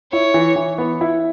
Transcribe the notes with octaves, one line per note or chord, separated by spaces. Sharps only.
E4 C#5
E3
E3
B3
E4